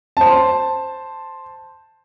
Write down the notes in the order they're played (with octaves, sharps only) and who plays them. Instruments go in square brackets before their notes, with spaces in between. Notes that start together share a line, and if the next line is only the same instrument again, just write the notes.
[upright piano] C5 A5